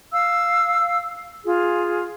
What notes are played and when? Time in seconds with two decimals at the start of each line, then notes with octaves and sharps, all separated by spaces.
0.13 F5 E6
1.44 F4 G#4